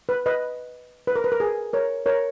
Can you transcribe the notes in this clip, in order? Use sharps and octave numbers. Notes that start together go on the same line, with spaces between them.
B4
B4 D#5
B4
A#4
B4
A#4
G#4
A#4 C#5
A#4 C#5